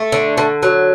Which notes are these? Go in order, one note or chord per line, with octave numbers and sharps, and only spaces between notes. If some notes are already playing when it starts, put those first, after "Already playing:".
Already playing: A3
D3
D3
F#3